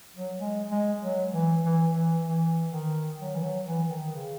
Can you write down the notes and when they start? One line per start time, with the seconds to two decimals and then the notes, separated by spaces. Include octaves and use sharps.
0.17 F#3
0.40 G#3
0.71 G#3
1.03 F#3
1.33 E3
1.65 E3
1.95 E3
2.26 E3
2.73 D#3
3.20 F#3
3.35 E3
3.43 F#3
3.66 E3
3.90 D#3
4.13 C#3